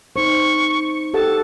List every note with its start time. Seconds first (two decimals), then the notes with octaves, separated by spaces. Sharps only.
0.16 D#4 C5 C#6
1.14 G4 A4 F#5 A5